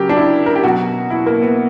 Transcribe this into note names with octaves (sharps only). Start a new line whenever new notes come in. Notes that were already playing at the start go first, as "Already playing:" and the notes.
Already playing: C#3 F#3 G4 A#4
D4
E4
A#4
G4
B2 F#3 F#4
E4
A#3
B3